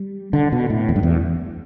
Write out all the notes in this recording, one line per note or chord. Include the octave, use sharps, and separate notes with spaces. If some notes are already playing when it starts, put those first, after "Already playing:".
Already playing: G3
D3
B2
A2
E2
G2
E2